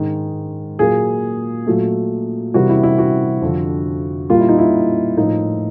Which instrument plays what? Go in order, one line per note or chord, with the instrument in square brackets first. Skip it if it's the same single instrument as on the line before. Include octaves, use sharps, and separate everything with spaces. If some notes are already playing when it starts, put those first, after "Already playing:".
Already playing: [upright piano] G#2 D#3 G#3
A#2 F#3 A#3 G#4
A#2 F#3 A3
C3 E3 G3 A#3 F#4
E4
E4
F#4
F2 D3 F3
A#2 G3 A#3 F4
E4
D#4
E4
A2 F3 A#3 D#4